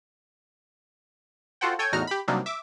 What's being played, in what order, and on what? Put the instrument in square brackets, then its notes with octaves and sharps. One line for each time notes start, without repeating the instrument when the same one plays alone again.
[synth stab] F4 F#4 A4 C5 F#5 G5
A4 C#5 G5 G#5 G#6
E2 A2 D#4 F#4 A#5 F6
G4 B5
C3 F#3 G3 A#3 D4 D#4
E5 D6